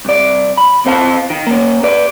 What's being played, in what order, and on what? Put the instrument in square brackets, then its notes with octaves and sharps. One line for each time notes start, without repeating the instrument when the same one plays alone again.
[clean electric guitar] C2 D5
B5
E2 C4 C5 F5 A5
D#3
A#3 C#4
B4 D5